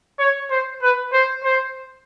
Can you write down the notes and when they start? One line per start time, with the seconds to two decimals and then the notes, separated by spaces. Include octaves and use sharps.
0.19 C#5
0.51 C5
0.82 B4
1.13 C5
1.44 C5